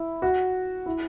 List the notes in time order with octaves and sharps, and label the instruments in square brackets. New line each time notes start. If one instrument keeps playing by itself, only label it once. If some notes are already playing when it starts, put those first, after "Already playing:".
Already playing: [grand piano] E4
F#4
E4